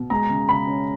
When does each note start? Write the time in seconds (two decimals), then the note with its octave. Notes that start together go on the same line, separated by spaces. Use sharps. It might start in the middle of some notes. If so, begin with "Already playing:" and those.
Already playing: B2
0.10 G#3 A#5
0.30 C#3
0.48 C#3 B5
0.67 C#4